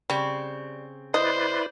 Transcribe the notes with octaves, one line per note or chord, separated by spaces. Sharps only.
C#3 G3 C4
E4 B4 C5 D5 D#5